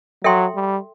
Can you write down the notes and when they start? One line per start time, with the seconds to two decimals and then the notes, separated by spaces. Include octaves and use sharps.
0.24 F#3 A4 E5 G5 C6
0.55 G3